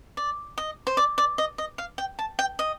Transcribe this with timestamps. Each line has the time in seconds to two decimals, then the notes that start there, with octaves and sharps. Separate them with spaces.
0.17 D5
0.58 D#5
0.87 C5
0.97 D5
1.18 D5
1.38 D#5
1.58 D#5
1.78 F5
1.98 G5
2.19 A5
2.39 G5
2.59 D#5